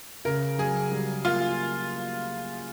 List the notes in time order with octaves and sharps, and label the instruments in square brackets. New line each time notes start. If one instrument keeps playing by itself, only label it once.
[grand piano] C#3 [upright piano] A#4
[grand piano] F#3 [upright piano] G#4
[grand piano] G3
[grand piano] A#3 [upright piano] F4